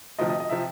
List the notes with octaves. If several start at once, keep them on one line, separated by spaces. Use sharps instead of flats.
D2 C3 F3 D#5
D#5
D#5
C3 F3 E5